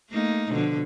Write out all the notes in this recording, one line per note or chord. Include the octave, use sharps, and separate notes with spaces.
A3 A#3 D#4
B2 D3 F3